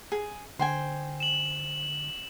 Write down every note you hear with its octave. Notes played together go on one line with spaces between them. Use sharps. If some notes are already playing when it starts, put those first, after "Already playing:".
G#4
D3 C5 G5 G#5
E7 F#7